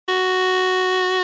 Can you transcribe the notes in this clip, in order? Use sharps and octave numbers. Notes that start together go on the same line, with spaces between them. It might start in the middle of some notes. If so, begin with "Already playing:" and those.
F#4